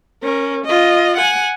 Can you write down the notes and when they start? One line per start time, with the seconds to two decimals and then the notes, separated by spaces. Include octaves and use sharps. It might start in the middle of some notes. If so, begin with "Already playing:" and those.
0.23 C#4 A#4
0.65 F4 D#5
1.17 F#5 G#5